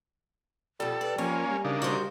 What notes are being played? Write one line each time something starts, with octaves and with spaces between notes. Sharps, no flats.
F2 B2 G3 A4
B4 D5
F3 A#3 C#4 G#5
G3
C#3 A#3 D4 D#4
G3 F#4 C5